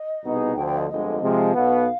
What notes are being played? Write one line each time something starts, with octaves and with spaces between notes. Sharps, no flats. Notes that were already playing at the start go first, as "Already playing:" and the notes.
Already playing: D#5
C2 B2 B3 D#4 G#4
D2 D3 F3 G5
G5
D#5
G1 F2 D3 G#3 D#5
C3 F3 G#3
B1 B2 B3 F5